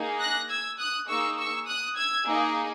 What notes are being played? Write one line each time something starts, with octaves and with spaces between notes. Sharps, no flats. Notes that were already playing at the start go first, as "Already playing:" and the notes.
Already playing: A#3 D#4 G#4
F#6 A#6
E6 G#6
D#6 F#6
A#3 D#4 G#4 C#6 E6
C#6 E6
D#6 F#6
E6 G#6
A#3 D#4 G#4